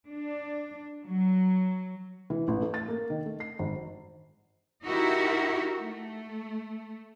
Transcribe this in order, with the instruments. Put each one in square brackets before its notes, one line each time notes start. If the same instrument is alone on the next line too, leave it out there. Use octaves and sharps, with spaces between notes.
[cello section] D4
F#3
[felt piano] E3
A1
A3
A6
A#3
D#3
A3
C7
G#1
[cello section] D#4 E4 F#4 G4 A#4 E5
A3